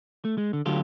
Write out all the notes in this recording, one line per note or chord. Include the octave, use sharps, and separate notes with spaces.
A3
G#3
D3
D2 D3 F#3 F4 G4 A4